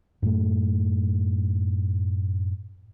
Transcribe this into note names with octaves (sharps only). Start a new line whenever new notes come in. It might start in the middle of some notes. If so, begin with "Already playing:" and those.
F#2 A2 A3